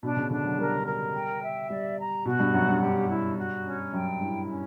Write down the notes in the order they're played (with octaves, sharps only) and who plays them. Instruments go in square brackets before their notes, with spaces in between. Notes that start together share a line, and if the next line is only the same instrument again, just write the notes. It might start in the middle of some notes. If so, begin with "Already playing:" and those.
[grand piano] B2 [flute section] D4
[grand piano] C#3
[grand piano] D3 [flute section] D4
[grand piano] F#3
[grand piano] G3 [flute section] A#4
[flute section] A#4
G5
E5
[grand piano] G3 [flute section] D5
[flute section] A#5
[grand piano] B2 [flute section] F#4
[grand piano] G2
[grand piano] F#2 [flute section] F#5
[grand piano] G2
[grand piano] G2 [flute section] G4
[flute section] E4
F#4
C#4
[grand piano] F#2 [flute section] G5
[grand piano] G2 [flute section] E4
[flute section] C#4